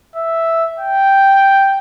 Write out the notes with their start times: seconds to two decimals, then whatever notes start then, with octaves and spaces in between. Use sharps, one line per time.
0.16 E5
0.80 G5